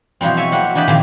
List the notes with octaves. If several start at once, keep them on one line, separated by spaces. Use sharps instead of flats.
B2 E3 F3 G3 C4
C#5 E5 G#5 A5
F#3 A#3 C4 F#5 B5
E3 D4 D#5 G5 A5 B5
A#2 D#3 F3 C4 G#4 A5